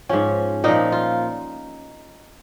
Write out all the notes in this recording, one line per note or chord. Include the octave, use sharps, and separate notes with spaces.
G#2 F3 C#4
A#2 F3 D#4
F4